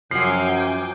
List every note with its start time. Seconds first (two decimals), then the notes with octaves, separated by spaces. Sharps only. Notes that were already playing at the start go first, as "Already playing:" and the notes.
0.11 F#2 F3 F#3 G5 G#5 D6 C7